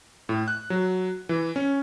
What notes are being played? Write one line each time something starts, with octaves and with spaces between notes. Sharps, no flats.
A2
F#6
F#3
E3
C#4